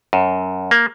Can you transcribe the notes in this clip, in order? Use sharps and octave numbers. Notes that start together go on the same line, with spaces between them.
F#2
A#3